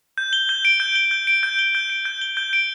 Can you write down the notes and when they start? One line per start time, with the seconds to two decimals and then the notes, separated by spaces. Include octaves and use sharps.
0.18 G6
0.33 G7
0.49 G6
0.65 D7
0.80 G6
0.95 G7
1.11 G6
1.27 D7
1.43 G6
1.59 G7
1.75 G6
1.90 D7
2.05 G6
2.21 G7
2.37 G6
2.53 D7